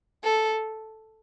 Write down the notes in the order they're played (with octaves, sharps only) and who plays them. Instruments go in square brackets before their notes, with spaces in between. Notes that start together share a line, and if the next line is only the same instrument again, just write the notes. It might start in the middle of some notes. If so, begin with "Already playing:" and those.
[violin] A4